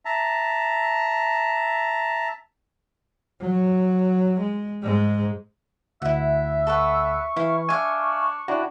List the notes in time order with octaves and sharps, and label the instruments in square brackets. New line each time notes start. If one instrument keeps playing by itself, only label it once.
[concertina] E5 A5 A#5
[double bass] F#3
G#3
G#2 G#3
[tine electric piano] D2 [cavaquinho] E4 F#5 [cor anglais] E5
[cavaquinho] A4 B4 F#5 [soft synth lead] C#6
[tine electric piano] E3 [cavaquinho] E4 F5
[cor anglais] D4 [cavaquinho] E5 F5 [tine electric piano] G#5
[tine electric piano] D4 E4 F#4 [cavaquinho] G4